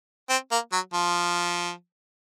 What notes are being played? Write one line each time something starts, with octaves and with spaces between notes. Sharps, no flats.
C4
A#3
F#3
F3